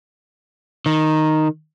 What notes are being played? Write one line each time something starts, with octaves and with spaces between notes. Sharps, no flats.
D#3